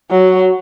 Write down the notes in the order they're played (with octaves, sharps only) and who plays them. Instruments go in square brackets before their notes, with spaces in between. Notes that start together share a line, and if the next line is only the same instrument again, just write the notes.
[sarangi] F#3